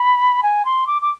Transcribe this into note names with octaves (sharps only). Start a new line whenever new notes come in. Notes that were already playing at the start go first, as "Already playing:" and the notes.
Already playing: B5
G#5
C6
D6
D6